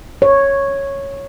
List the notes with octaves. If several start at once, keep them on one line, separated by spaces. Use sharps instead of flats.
C#5